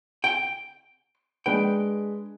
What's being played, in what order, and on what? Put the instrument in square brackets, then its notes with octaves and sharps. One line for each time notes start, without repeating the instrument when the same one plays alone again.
[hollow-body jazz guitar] G5
[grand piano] G#3 D4 B4 [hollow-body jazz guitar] G5